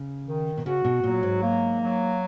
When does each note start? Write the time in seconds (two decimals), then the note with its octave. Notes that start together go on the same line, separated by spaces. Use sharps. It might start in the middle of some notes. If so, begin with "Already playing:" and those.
Already playing: C#3
0.27 D#3
0.57 B2
0.66 C#3 F#4
0.84 B2
1.03 A#2 F#3
1.23 G#2
1.41 A#3
1.80 F#3